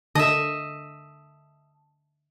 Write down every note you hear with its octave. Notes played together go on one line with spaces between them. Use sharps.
D3 D#5 E5 A5